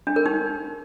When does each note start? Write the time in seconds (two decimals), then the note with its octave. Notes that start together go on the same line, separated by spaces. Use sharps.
0.07 D4
0.16 A#4
0.26 D#4